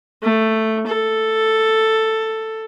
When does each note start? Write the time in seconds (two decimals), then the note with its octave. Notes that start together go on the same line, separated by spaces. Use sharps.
0.23 A3
0.87 A4